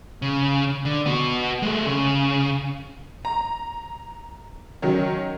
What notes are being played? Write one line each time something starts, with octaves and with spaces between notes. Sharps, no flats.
C#3
D3
B3 F#4
G#3 A3
C#3
A#5
D#3 F#3 C#4